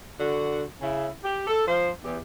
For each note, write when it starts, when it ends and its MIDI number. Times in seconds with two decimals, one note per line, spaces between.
0.18 0.62 50
0.18 0.62 66
0.81 1.07 49
0.81 1.07 64
1.23 1.42 67
1.47 1.66 69
1.66 1.89 53
1.66 1.89 72
2.03 2.17 40
2.03 2.17 67